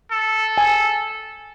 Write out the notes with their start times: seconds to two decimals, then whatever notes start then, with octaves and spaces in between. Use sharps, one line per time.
0.11 A4
0.58 G#5